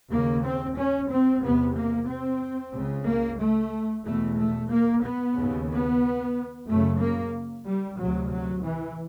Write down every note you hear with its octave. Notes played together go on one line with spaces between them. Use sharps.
D#2 C#3 A#3
C4
C#4
C4
E2 C3 B3
A#3
C4
C#2 C#3
A#3
A3
E2 B2 A3
A3
A#3
B3
D#2 C#3
B3
F#2 C#3 A3
A#3
G3
D2 C3 F#3
F#3
E3